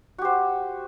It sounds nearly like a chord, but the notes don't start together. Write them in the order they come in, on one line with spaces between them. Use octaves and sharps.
F#4 G4 C5